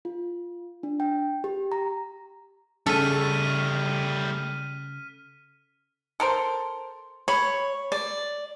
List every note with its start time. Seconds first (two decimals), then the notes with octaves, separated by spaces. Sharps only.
0.05 F4
0.83 D4
1.00 G5
1.44 G4
1.72 A#5
2.86 C#3 G3 A3 A4 F6 B6 D#7
6.20 A4 A#4 C5
7.28 C#5 B5
7.92 D5